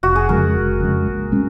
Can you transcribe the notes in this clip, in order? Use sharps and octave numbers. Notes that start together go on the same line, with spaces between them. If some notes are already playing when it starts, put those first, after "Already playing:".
F1 F#4
G#4
F2 C#3 G#3 A#4
F1
F2 C#3 G#3
A#1
A#2 G#3 C#4